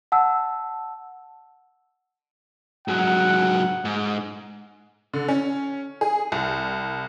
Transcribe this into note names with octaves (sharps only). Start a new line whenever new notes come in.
F#5 A5 E6
G#2 F#3 F#5
G#2
D3
C#4
G#4
C2